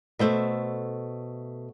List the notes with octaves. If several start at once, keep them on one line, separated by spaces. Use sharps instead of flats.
B2 A3 C5 E5